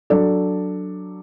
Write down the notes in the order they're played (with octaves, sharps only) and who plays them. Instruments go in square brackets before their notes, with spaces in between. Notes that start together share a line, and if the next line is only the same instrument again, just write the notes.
[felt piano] F#3 D4 A4 D5